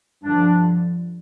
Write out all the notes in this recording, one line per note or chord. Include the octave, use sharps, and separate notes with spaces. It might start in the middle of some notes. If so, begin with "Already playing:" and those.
G2 D3 F3 D4